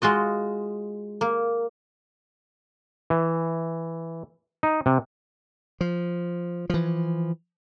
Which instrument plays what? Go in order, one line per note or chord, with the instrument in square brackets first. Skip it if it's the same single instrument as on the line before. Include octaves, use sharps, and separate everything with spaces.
[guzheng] G#3 F4 F#4 D#5
A#3
[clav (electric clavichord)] E3
D#4
C3
[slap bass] F3
E3 F3